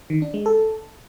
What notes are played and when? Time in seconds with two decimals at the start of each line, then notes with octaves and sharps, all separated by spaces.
0.10 D#3
0.22 D4
0.34 G#3
0.46 A4